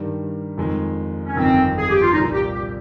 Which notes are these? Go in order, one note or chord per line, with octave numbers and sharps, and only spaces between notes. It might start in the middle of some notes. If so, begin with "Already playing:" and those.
Already playing: G2 D#3 G3
F2 D#3 G#3
C#4
G1 F2 D#3 C4
G#4
G4
F4
C2 A#2 F3 D#4
G4
G4